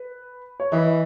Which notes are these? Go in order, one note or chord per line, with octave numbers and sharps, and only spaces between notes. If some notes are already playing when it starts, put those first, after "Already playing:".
Already playing: B4
C#5
E3 B4 D#5